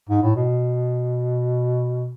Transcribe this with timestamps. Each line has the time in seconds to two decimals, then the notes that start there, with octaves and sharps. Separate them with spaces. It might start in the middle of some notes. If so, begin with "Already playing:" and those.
0.09 G#2
0.23 A2
0.36 B2